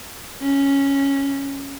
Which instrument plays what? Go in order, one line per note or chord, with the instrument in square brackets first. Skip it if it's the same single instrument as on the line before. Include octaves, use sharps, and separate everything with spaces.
[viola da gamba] C#4